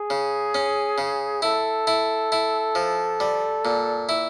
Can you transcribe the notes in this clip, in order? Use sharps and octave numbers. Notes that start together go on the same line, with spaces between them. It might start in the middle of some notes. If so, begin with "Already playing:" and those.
Already playing: G#4
C#3
C#4
C#3
E4 A4
E4
E4
F3
G3
A#2
E4